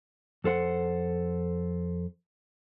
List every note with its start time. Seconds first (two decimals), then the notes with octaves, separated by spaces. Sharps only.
0.44 F2 A4 C5 F#5